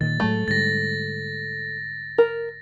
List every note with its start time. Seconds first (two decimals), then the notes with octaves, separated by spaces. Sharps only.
0.01 A#2 D#3 A6
0.20 A2 F#3 G#3 A3
0.48 G#2 D3 G3 A6 A#6
2.18 A#4